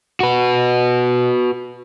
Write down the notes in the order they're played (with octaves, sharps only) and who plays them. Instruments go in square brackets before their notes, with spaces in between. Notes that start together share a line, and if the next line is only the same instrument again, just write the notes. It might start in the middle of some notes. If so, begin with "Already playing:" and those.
[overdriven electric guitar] F#4 B4